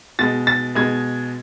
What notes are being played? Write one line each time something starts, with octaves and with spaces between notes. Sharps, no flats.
B2 G#3 A6
A6
B2 G#3 G#6